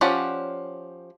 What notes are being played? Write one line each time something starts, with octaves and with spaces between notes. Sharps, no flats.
F3 C#4 G4 D5 F#5